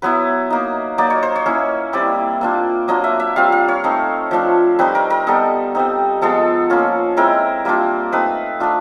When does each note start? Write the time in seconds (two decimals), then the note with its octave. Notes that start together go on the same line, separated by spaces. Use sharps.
0.02 F#3 B3 E4 B4
0.50 A#3 D#4
0.98 F#3 A#3 D#4 D5
1.10 C#5
1.23 C5
1.36 C#5
1.46 A#3 C#4 E4
1.93 G3 C4 E4 D5
2.41 A#3 D4 F4
2.88 F#3 A#3 D4 F4 D#5
3.04 E5
3.20 E5
3.36 G3 C4 F4 F5
3.52 F5
3.68 C#5
3.84 A3 C4 D#4
4.31 F3 A3 D4 F4
4.79 G3 C4 D#4 B4
4.95 A#4
5.10 A#4
5.27 G3 B3 D#4 A4
5.75 G3 C4 D#4
6.21 F3 G#3 B3 A4
6.70 A#3 C#4 F4
7.17 G#3 C4 E4 A#4
7.65 G3 A#3 D4 F4
8.12 A3 C4 D#4 B4
8.60 A3 D4 F4